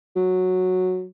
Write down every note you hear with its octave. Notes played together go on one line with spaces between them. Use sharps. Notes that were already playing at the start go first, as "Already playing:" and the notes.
F#3